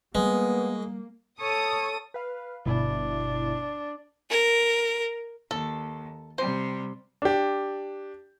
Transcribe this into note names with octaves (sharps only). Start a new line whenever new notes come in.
G3 G#3 A#3 B3
A4 C#5 D#6
B4 F5
G1 B2 D4 E4
A#4
D#2 A4
C3 G3 C5
D4 G4